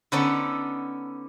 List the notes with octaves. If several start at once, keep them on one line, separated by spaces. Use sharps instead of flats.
D3 B3 C#4 D#4 A4 D5